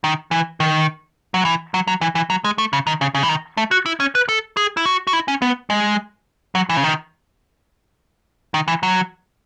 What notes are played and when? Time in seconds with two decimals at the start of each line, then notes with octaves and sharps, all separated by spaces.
0.04 D#3
0.31 E3
0.60 D#3
1.34 F#3
1.45 E3
1.74 F#3
1.88 F#3
2.01 E3
2.15 E3
2.30 F#3
2.44 G#3
2.58 A3
2.73 C#3
2.87 D#3
3.01 C#3
3.15 C#3
3.23 E3
3.29 D#3
3.57 A3
3.71 F#4
3.86 E4
4.00 C#4
4.15 B4
4.29 A4
4.57 G#4
4.77 E4
4.86 F#4
5.07 F#4
5.13 E4
5.28 C#4
5.42 B3
5.70 G#3
6.55 F#3
6.69 E3
6.77 C#3
6.84 D#3
8.54 D#3
8.68 E3
8.83 F#3